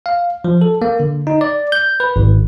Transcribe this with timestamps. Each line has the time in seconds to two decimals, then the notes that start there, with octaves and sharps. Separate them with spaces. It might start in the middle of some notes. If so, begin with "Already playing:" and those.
0.06 F5
0.44 F3
0.61 A4
0.82 A#3
1.00 D3
1.27 D#4
1.41 D5
1.72 G6
2.00 B4
2.16 G#1